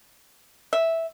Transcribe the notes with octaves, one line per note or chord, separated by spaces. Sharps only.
E5